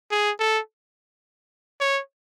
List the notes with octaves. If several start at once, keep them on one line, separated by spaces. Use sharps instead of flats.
G#4
A4
C#5